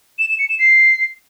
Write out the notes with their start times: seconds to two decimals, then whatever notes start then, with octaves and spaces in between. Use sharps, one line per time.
0.19 E7
0.29 E7
0.39 C#7
0.49 E7
0.59 C7